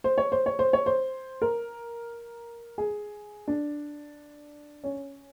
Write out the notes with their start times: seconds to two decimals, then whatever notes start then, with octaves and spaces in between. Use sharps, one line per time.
0.04 C5
0.18 C#5
0.32 C5
0.46 C#5
0.59 C5
0.73 C#5
0.86 C5
1.42 A#4
2.78 G#4
3.48 D4
4.84 C#4